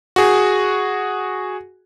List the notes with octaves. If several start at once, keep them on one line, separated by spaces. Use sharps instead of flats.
F#4 G#4